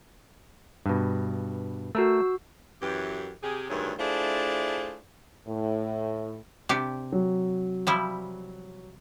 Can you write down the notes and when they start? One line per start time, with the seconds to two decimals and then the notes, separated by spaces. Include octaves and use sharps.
0.86 G2 B2
1.95 A3 F#4 A#4 E6
2.81 F#2 E3 G4
3.43 C3 G4 G#4
3.69 D2 G2 D#3 F#3 E4 G#4
3.99 A3 D4 E4 F4 G#4 C5
5.46 A2
6.69 C3 D4 G4
7.12 F#3
7.87 F3 G3 E4